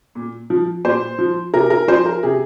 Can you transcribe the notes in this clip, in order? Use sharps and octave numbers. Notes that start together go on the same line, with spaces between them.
A#2
F3
A#2 C5
F3
C3 A#4
A#4
F3 C5
A#4
C3 G#4